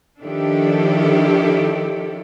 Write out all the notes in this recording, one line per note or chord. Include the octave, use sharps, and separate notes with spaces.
D#3 F3 D4 E4 G4 A4